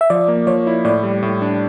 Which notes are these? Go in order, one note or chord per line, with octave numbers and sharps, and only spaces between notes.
E5
F3 D5
A#3
F3 C#5
E4
A2 D5
G3
A2
D4